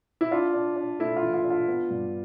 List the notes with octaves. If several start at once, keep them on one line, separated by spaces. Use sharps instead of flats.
E4
D4 F4
D4
D4
A3 E4
F4
E3
F4
D4
F4
B3
G2